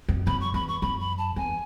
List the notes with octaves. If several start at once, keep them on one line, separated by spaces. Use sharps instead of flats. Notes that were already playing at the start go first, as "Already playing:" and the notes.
F#2
F#2 B5
C#6
E2 B5
C#6
F#2 B5
B5
A5
E2 G#5